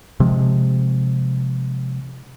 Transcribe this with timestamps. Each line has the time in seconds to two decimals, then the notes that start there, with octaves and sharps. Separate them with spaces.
0.20 C3 F3 G#3